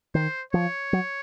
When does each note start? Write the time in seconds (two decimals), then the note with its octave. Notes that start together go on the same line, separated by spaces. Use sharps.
0.15 D#3 C5
0.53 F3 C#5
0.93 F#3